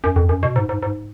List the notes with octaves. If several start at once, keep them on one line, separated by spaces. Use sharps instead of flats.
F#2
F2
F#2
B2
G#2
G#2
G#2